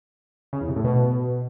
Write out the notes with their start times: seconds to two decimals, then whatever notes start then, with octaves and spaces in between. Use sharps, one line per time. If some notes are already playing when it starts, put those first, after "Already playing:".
0.53 C#3
0.61 E2
0.69 C3
0.76 A2
0.84 B2